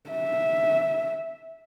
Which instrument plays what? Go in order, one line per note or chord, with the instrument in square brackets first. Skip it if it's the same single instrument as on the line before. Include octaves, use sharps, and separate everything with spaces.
[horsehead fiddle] E5